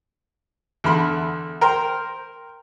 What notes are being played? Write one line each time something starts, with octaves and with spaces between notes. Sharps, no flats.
E2 D3 B5 C6
A#4 C5 G5 A#5 C6